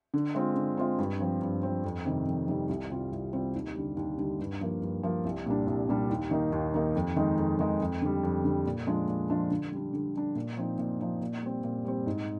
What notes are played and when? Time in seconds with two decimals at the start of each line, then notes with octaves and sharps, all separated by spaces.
0.14 D3
0.35 G#3 C4 F4
0.56 D3
0.77 G#3 C4 F4
0.99 G2
1.20 F3 C4
1.41 G2
1.63 F3 C4
1.84 F2
2.06 C3 D#3 G3
2.27 F2
2.48 C3 D#3 G3
2.69 C2
2.90 C3 G3 C4 F4
3.12 C2
3.33 C3 G3 C4 F4
3.55 D#2
3.76 D3 G3
3.97 D#2
4.18 D3 G3
4.40 G2
4.61 F3 A#3
4.82 G2
5.03 F3 A#3
5.25 C2
5.46 A#2 G3 D4
5.67 C2
5.89 A#2 G3 D4
6.10 D#2
6.31 D#3 A#3 D#4
6.52 D#2
6.74 D#3 A#3 D#4
6.95 F2
7.16 D#3 G#3 D#4
7.38 F2
7.59 D#3 G#3 D#4
7.81 F2
8.02 D3 G3
8.23 F2
8.44 D3 G3
8.66 A#2
8.87 F3 G#3 D4 F4
9.08 A#2
9.30 F3 G#3 D4 F4
9.51 D3
9.72 G3 D4
9.93 D3
10.15 G3 D4
10.35 A#2
10.57 F3 C4 D#4
10.79 A#2
11.00 F3 C4 D#4
11.21 A#2
11.43 G3 C4
11.64 A#2
11.85 G3 C4
12.06 G#2